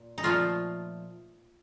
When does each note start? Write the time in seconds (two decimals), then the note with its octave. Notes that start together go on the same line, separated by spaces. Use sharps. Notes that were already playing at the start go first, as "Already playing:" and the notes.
Already playing: A#2
0.18 D#4
0.23 A#2 F3 A3 F4